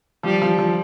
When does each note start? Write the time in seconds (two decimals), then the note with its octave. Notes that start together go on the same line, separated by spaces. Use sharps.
0.23 F3 G3
0.42 F3
0.59 F3